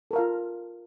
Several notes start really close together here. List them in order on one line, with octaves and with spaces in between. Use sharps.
A4 A#4 F5 F4